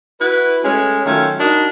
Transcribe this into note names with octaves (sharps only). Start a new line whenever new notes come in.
E4 F#4 B4
G#3 A3 C#4
D#3 F#3 A3 C#4 F4
D4 D#4 F#4 A#4 D#5